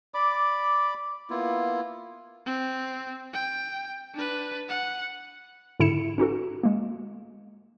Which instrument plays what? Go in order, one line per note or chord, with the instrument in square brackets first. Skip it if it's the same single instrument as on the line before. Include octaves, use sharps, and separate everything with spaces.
[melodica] D5 B5 D6
A#3 B3 E4 F4
[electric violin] C4
G5
D4 B4
F#5
[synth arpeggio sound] G#2 D3 E4 C#7 E7
C#4 D#4 F#4 A4
G#3 A#3